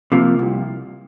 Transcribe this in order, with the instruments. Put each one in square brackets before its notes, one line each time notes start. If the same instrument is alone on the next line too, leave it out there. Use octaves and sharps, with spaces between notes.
[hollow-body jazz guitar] C3 F3 A#3
C2